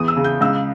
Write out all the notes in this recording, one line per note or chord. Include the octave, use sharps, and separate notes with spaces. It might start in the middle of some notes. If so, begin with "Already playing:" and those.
Already playing: E2 E3 D#6
E6
C#3
G6
C#2 E6